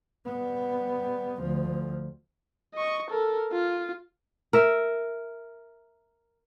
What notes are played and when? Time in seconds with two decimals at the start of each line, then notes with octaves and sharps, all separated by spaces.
0.26 G3 B3
1.41 D2 F3
2.75 D#5 C#6
3.11 A4 A#4
3.52 F4
4.53 A#4 E5